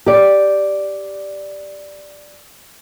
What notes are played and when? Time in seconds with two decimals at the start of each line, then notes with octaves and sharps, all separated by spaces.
0.06 G4 D5